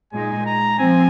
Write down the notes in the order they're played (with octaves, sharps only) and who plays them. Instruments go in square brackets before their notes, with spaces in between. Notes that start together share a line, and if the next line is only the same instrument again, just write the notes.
[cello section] A#2 G#3 D#4 [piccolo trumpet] G#5
[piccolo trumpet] A#5
[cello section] F3 C4 [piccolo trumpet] G#5